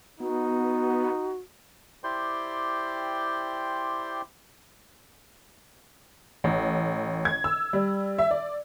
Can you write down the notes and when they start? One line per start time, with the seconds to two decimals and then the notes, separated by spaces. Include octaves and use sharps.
0.20 B3 D#4 F#4
2.04 E4 G4 C5 D5 G5 C6
6.44 A1
7.25 G#6
7.44 E6
7.73 G3
8.18 E5
8.31 D5